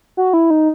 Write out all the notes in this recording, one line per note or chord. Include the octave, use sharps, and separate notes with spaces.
F#4
E4
D#4